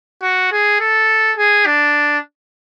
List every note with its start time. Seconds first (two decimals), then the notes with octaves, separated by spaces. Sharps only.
0.22 F#4
0.52 G#4
0.80 A4
1.38 G#4
1.66 D4